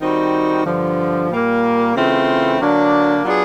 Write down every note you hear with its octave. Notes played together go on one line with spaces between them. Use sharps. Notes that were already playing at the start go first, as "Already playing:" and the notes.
D#3 G3 C4 D#4 F#4
G2 D3 F3
A#2 G3 A#3
C#3 E3 A3 C4 F4
D3 F#3 A#3 D4
F#3 B3 D4 F4 G#4